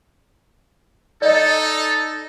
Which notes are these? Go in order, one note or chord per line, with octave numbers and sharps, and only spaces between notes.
D#4 A4 D5 D#5